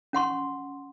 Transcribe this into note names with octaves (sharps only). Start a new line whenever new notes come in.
C#4 F#5 C6 C#6